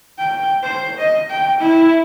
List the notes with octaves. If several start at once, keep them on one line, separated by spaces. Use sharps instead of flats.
G5
C5
D#5
G5
E4